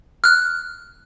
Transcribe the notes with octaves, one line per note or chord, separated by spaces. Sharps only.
F6 F#6